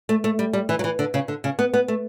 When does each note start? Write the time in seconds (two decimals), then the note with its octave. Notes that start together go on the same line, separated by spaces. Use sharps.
0.09 A3
0.24 A3
0.39 G3
0.53 G3
0.69 E3
0.79 F#3
0.84 E3
0.99 D3
1.14 C#3
1.28 D3
1.44 C#3
1.59 B3
1.74 B3
1.88 A3